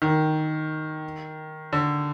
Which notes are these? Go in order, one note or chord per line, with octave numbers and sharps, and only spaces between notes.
D#3
D3